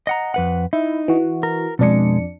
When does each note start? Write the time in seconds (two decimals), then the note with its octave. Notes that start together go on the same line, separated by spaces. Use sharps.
0.07 D#5 F#5 A#5
0.34 F2 B4 F#5
0.73 D#4 E4
1.08 E3 F#4
1.43 A#4
1.79 F2 B2 G#3 D4 C#7